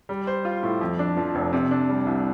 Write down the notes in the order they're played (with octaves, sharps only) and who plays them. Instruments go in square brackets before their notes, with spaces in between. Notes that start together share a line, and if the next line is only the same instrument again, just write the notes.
[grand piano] G3
C5
F4
A2
F2
D4
F3
F1
C3
D4
G3
C2